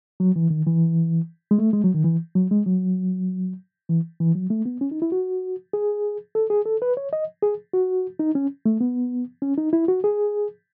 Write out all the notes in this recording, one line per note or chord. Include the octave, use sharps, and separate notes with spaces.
F#3
E3
D#3
E3
G#3
A3
G#3
F#3
D#3
E3
F#3
G#3
F#3
E3
E3
F#3
A3
B3
C#4
D#4
E4
F#4
G#4
A4
G#4
A4
B4
C#5
D#5
G#4
F#4
D#4
C#4
A3
B3
C#4
D#4
E4
F#4
G#4